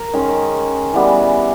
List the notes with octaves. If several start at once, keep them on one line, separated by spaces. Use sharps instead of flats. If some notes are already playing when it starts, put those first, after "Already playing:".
Already playing: A#4
D#3 G#3 C#4
E3 G3 B3